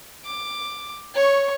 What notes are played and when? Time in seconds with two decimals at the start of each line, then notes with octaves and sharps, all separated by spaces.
0.25 D6
1.14 C#5 C#6